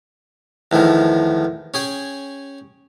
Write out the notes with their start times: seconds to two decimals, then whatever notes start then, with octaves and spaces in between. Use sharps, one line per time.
0.71 E2 A2 D#3 F3
1.74 C#4 G#4 G5